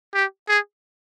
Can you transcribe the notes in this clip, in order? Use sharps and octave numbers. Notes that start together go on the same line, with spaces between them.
G4
G#4